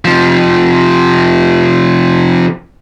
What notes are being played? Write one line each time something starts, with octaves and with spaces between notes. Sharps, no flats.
C3 F3